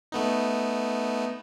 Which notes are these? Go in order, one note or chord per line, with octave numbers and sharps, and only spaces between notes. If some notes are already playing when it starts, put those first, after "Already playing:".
A3 B3 D#4